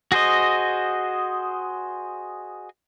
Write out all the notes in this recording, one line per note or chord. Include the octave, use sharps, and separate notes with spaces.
F#4 G#4 C5 D#5